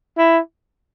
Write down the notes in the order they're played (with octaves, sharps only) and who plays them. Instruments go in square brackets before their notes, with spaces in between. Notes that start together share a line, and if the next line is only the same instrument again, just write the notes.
[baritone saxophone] E4